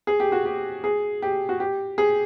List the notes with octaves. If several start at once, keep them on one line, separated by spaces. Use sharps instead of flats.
G#4
G4
F#4
G4
G#4
G4
F#4
G4
G#4